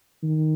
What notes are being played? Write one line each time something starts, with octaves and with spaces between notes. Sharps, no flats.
D#3